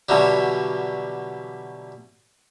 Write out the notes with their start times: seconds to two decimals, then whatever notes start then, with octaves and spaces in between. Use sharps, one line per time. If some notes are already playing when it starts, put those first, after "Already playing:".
0.09 B2 D3 E3 F#3 G3